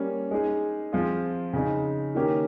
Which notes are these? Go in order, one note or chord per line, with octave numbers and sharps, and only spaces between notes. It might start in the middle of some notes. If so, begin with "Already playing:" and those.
Already playing: G3 A#3 C#4
G#3 D#4 G#4
F3 C4 F4 G#4
C#3 G#3 D#4
D#3 A#3 C#4 G4